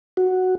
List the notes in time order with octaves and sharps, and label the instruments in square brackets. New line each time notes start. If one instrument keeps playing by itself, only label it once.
[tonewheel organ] F#4